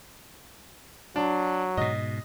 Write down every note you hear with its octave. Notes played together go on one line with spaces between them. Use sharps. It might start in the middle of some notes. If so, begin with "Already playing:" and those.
F#3 D4
G#2 B2 D#5